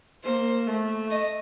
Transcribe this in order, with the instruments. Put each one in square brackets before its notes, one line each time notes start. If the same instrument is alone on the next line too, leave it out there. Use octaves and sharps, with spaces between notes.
[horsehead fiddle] A#3 [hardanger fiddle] C5
[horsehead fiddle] A3
[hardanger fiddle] D#5